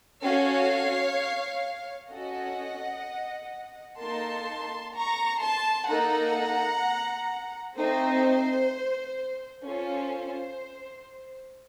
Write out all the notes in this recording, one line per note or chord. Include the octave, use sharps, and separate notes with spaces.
C#4 F#4 A4 C#5 F5
C#4 F#4 A4 D#5 F#5
A#3 D#4 A4 A5 C6
A#5 C#6
A5 C6
A#3 D#4 A4 F#5 A#5
A3 C4 D#4 C5
C#4 F4 A4 C5